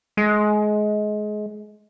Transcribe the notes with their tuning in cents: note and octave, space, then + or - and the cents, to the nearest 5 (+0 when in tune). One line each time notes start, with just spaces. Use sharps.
G#3 +25